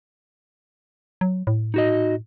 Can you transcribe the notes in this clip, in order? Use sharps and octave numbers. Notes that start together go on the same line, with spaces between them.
F#3
A2
D#4 F#4 D#5